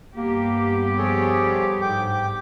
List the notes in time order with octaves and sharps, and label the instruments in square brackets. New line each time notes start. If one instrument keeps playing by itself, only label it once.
[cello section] G2 B3 G4 [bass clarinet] A#3
[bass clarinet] F3 [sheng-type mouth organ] G#4 A4 C#5
[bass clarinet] G#2 [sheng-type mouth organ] G5 D6